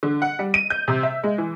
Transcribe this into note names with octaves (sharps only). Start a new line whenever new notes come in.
D3
F#5
G3
D#7
G6
C3
E5
G#3
E3